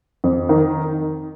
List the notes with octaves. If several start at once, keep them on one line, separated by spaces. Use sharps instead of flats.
F2
D#3